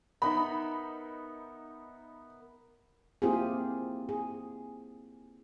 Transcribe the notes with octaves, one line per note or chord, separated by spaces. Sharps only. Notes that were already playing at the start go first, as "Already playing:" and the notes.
B3 D#4 A#4 E5 B5
A#3 C4 E4 F4 G4 G#4
G#4